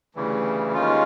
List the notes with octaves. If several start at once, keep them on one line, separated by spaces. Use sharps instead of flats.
D2 C#3 E3 G3
D#2 D#3 G#3 C#4 F4